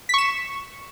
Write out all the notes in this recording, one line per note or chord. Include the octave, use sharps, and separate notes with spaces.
C#6 B6 E7